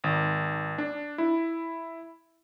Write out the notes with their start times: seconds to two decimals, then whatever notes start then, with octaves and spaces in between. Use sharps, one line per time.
0.04 G#1
0.78 D4
1.18 E4